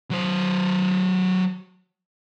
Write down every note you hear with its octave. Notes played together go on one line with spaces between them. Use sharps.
F#3 C5